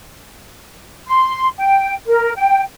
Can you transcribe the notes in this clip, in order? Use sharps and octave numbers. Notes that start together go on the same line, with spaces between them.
C6
G5
A#4
G5